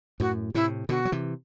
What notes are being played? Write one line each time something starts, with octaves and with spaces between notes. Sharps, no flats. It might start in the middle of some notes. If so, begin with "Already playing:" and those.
F#2 A2 F#4
A2 C3 E4
B2 D3 F#4
F#3
C3 E3